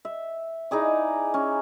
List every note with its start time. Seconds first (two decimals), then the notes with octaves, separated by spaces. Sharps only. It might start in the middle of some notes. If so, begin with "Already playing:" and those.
0.05 E5
0.71 D#4 E4 G#4 D5
1.34 C#4